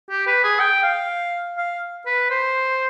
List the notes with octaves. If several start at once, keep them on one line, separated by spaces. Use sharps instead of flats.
G4
B4
G#4
G5
F5
F5
B4
C5